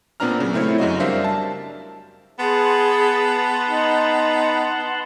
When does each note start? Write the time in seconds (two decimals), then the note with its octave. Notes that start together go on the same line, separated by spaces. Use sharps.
0.20 A#2 B3 C4 D4 A#5 F6
0.40 C#3 F#3
0.53 A3 C4 E4 C5 C#5
0.78 F#2 C#3 F#4 D#5
0.99 G3 D4 A#4 C5 E5 F5
1.24 A5
2.39 B3 G#4 F#5 A5 C6
3.67 D#4